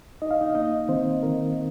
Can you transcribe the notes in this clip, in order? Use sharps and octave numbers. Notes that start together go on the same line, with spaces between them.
D#4 D#5
F5
D#4 D#5
A#3 D#4 D#5
D#3 C4 C5
D#3 A#4